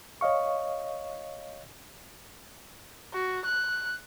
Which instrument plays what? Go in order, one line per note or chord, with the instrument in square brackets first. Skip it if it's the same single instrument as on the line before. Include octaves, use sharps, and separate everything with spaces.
[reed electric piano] C#5 D#5 F5 C#6
[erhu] F#4
F#6